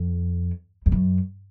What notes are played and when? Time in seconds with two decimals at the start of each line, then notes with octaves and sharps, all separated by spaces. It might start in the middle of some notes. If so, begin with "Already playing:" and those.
Already playing: F2
0.86 F2
0.92 F#2